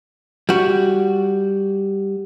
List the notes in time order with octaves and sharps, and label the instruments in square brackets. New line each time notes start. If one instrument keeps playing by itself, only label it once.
[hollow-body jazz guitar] G3 F#4